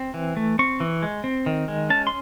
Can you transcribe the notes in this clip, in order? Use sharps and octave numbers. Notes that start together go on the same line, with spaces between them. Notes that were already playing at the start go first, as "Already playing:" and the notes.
Already playing: C4
E3
A3
C4 C#6
E3
G#3
C4
D#3
G#3
C#4 A5
C6